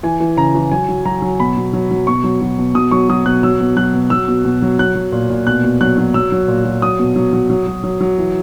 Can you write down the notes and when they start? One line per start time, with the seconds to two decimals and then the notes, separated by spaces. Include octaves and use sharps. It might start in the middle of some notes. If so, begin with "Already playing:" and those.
0.03 E3 G#5
0.20 E3
0.37 C#3 A#5
0.55 E3
0.72 F#3 G#5
0.89 F#3
1.05 F#3 A#5
1.22 F#3
1.40 B2 B5
1.57 B2
1.73 F#3
1.91 F#3
2.07 B2 C#6
2.24 F#3
2.41 F#3
2.59 B2
2.74 B2 D#6
2.91 F#3 C#6
3.09 F#3 D#6
3.25 B2 F#6
3.43 F#3 E6
3.61 B2
3.77 F#3 F#6
3.94 B2
4.10 F#3 E6
4.28 B2
4.45 B2
4.62 F#3
4.79 F#3 F#6
4.95 F#3
5.12 A#2
5.30 A#2
5.47 B2 F#6
5.64 B2
5.81 F#3 F#6
5.98 F#3
6.14 F#3 E6
6.32 F#3
6.48 A#2
6.65 F#3
6.82 F#3 D#6
6.99 B2
7.16 F#3
7.33 F#3
7.50 F#3
7.67 F#3
7.84 F#3
8.01 F#3
8.18 E3